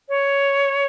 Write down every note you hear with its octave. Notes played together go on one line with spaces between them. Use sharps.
C#5